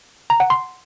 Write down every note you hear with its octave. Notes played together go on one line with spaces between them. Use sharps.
A#5
F#5
C6